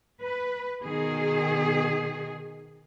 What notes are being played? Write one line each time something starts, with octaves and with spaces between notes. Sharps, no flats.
B4
B2 D#3 G#4